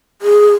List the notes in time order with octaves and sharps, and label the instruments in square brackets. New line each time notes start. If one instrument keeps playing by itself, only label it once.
[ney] G#4